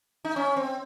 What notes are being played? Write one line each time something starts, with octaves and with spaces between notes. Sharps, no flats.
D#4
C#4
C4